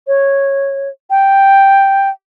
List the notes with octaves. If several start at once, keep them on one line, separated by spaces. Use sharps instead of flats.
C#5
G5